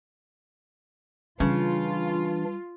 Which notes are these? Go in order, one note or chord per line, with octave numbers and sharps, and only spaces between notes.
C#3 E3 G3 D4 F4